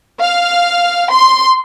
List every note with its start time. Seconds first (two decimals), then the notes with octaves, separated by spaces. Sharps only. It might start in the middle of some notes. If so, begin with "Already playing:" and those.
0.21 F5
1.10 C6